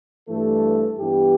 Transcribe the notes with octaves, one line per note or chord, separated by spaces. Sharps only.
G2 E3 A3 A4
G2 E3 B3 G4